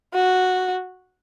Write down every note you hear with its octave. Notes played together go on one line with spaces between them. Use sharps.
F#4